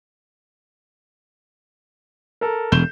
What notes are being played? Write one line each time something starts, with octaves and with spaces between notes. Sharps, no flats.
A4 A#4
E1 G6 E7 G7